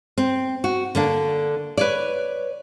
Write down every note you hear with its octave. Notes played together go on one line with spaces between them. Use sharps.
C4
F#4
D3 A#3 D4
B4 C#5 D5